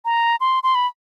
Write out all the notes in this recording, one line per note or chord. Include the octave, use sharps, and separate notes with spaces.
A#5
C6
C6
B5